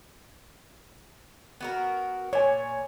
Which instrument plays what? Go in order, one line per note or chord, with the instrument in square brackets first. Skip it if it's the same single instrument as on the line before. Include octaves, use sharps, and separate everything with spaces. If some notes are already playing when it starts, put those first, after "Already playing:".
[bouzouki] B3 F#4 A#4
[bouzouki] A#2 [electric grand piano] C#5 G#5